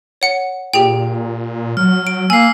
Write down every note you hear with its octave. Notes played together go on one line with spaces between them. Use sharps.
C#5 F#5 C#7
A#2 G4 G#4 G5
F#3 F6
D7
A#3 G#5 E6 C7